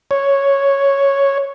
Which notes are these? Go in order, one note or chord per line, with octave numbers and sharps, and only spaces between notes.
C#5